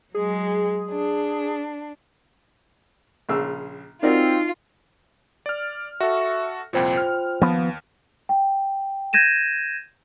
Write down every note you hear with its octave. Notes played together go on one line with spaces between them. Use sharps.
F#3 G#3 G#4
D4
A#1 C#3 E6
C4 D#4 F4 F#4 A#4 D5
D5 F6
F#4 A4 E5 C#6
C2 F2 A#2 F4 C5 G5
F6
D#2 F3 B3
G5
G6 G#6 A#6 D#7 E7